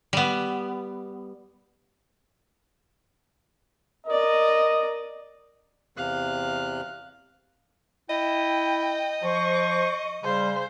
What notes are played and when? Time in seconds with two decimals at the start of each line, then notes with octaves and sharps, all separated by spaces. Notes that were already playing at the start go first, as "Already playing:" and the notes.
0.13 G3 B3
4.07 A#4 D5 D#5
5.97 E2 C3 F5 F#6
8.10 E4 D#5 G5
9.23 F3 C5 C#6
10.23 C#3 G3 C5